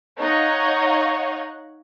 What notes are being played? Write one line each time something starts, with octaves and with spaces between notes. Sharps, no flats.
D#4 C#5 D#5 F5 F#5 C#6